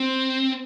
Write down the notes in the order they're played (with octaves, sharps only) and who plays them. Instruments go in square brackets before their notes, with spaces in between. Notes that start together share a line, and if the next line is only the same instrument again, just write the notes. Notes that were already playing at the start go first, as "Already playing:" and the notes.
Already playing: [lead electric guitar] C4